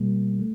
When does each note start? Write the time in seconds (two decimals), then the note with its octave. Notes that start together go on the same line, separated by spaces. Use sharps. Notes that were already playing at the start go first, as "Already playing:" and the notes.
Already playing: B2 G3 A#3
0.39 A3